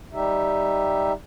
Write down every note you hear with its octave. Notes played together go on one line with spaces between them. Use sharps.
G3 D#4 G4 E5